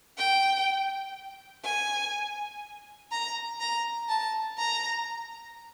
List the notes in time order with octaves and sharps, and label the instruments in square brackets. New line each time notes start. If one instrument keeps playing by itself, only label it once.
[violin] G5
G#5
A#5
A#5
A5
A#5